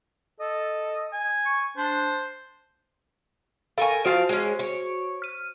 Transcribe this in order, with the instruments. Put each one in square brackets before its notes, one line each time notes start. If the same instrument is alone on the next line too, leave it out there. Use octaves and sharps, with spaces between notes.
[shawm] A4 [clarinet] D#5
[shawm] G#5
[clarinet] C#6
[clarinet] D4 [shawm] C5
[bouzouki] A4 A#4 G#5 [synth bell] F5 C#6
[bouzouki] F3 F4 A5 [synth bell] F#4 C5 D7
[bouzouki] G#3 C#4
C#5
[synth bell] F6 D#7